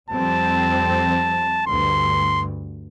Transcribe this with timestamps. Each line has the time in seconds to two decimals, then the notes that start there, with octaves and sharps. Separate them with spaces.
0.10 F2 G3 C4 A5
1.67 D2 G2 C6